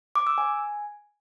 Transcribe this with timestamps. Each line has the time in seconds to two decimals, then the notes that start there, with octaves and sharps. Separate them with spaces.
0.15 D6
0.27 E6
0.38 G#5